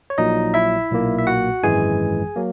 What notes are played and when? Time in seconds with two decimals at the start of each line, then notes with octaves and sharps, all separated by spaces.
0.10 C#5
0.18 A#1 A#2 F#3 D#4 D#5
0.54 E4 E5
0.91 B1 A#2 A#3
1.18 E5
1.27 F#4 F#5
1.63 G#1 F#2 E3 G#3 G#4 G#5
2.36 F#3 A#3